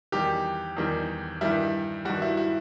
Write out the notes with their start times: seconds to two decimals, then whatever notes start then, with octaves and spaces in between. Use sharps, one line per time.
0.12 E2 D#3 G3 G4
0.77 E2 D#3 G3
1.41 G2 D#3 G3 E4
2.05 G2 D#3 G3 F#4
2.22 E4
2.37 E4